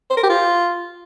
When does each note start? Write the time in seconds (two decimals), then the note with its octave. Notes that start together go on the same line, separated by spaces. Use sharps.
0.11 C5
0.17 A#4
0.23 G4
0.30 F4